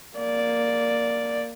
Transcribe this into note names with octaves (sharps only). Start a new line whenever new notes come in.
A#3 D5